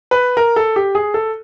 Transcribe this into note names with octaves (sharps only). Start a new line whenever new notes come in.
B4
A#4
A4
G4
G#4
A4